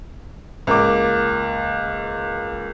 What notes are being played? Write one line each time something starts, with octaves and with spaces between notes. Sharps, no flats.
C#2 A#3 D6